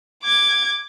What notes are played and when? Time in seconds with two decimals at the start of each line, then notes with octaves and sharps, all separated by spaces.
0.24 D6 G#6